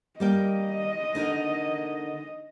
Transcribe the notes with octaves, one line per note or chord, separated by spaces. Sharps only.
G3 A#3 D#5 G5
D3 D#4 A#4